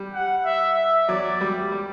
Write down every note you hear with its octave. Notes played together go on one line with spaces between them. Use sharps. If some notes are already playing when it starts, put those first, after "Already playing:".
Already playing: G3
F#5
E5
E5
F#3 D5
G3
G3